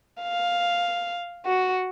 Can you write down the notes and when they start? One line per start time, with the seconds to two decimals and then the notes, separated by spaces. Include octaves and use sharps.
0.23 F5
1.46 F#4